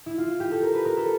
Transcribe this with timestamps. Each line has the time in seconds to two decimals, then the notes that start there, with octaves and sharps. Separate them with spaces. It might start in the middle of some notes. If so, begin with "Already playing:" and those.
0.06 E4
0.18 F4
0.40 G4
0.51 A4
0.63 A#4
0.74 B4
0.85 A#4
0.97 A4